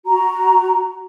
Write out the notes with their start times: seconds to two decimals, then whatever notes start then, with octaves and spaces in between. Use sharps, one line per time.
0.06 F#4 A#5